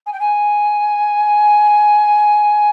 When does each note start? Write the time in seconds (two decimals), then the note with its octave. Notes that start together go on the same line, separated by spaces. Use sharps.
0.06 G#5
0.12 G5
0.19 G#5